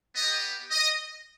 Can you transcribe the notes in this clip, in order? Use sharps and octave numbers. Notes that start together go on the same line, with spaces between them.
B3 G4 D#5
D#5